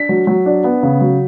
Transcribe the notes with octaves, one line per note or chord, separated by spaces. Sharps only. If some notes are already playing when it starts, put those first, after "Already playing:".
Already playing: D4 B6
F#3
F#3
D4
B3
C#3
F#3